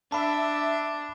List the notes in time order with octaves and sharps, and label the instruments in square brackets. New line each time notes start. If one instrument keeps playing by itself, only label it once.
[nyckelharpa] D4 [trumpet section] E5 [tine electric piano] A5 B5